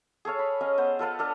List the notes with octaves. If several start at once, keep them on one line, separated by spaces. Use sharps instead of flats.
G#4 A4 C#5 F5
B5
C#4 D#5 F5
B3 C5
F4 A4 B4 F5
D4 A4 F5